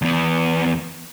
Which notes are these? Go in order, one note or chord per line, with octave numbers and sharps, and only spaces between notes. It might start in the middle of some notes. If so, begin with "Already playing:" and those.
E2 B3